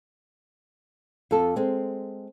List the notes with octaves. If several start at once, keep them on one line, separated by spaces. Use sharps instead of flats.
F2 A4
G#3 C4